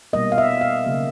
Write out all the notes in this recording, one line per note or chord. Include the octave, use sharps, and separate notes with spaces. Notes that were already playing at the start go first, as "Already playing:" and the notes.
B2 G3 A#3 D#5
F5
E5
F5
C#3 F#3 A#3